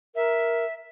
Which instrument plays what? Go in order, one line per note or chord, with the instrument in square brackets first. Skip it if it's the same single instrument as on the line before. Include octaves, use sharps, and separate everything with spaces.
[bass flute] A#4 [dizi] E5